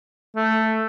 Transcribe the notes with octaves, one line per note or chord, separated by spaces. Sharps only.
A3